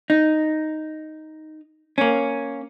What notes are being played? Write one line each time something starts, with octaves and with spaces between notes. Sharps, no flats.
D#4
A#3 C#4